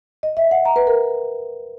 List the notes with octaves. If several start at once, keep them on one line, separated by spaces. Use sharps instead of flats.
D#5
E5
F#5
A#5
B4
A#4